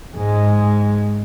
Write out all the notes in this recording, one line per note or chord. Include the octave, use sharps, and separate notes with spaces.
G#2 G#3